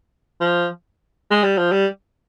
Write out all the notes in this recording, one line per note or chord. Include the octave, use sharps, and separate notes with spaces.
F3
G#3
G3
F3
G3